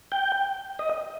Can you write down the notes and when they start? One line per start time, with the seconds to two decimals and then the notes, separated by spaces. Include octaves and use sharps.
0.12 G5
0.79 D#5